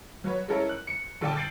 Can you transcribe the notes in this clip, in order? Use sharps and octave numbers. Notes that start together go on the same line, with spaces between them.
F#3 F#4 B4 C#5
G#3 C#4 E4 A4 A#4 C#5
F#6
C#7
A#1 D3 D5 G5 A5
G6 A6 C7 D7 F#7